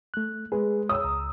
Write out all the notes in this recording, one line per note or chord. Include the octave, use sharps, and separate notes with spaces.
A3 F#6
G#3 G#4 B4
C#5 D#6 E6
C#2 A#5